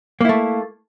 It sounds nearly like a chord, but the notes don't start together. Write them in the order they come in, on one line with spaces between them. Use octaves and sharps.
A#3 E4 A3